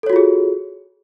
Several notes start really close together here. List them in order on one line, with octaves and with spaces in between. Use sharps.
A4 C#5 F#4 F4 G#4